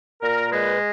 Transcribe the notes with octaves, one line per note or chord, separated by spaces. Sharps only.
A#2 A#4
G#3 B4